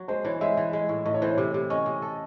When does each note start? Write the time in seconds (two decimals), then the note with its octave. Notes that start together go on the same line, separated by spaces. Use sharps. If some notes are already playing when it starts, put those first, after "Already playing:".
Already playing: F#3
0.08 G#3 C5
0.25 E3 C#5
0.41 G#3 E5
0.57 E3
0.73 G#3
0.89 A2
1.06 A2 D#5
1.14 C#5
1.21 E3 C5
1.30 C#5
1.38 C3
1.54 C3
1.70 C#4 D#5
1.86 C3
2.02 A4